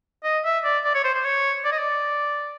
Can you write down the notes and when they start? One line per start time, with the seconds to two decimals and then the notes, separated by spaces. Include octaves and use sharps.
0.24 D#5
0.45 E5
0.64 D5
0.84 D5
0.95 C#5
1.04 C5
1.14 C5
1.24 C#5
1.65 D5
1.72 D#5
1.79 D5